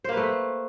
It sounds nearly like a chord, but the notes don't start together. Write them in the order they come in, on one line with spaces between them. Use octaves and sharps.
C5 A#3 B4 A3